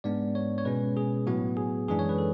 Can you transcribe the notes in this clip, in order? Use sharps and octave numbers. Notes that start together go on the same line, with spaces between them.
G#2 G#3 B3 D4 D5
C#5
C#5
B2 G#3 C#4 B4
G#4
A2 F#3 B3 F#4
G#4
F#2 E3 G#3 D4 G#4
C#5
B4
A4